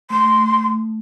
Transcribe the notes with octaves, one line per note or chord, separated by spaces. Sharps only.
A3 C6